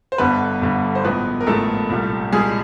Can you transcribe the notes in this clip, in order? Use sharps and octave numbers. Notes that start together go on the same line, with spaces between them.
C5
G1 G2 D3 G3 B3 B4
G1 G2 D3 G3
C5
A1 G#2 F3 G#3 B3 B4
A#4
A1 G#2 F3 G#3 A3 A4
C2 A#2 G3
C2 A#2 G3 G#3 G#4